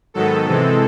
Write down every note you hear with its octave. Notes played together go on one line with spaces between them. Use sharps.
G#2 D#3 F#3 B3 A4
C3 E3 G#3 C4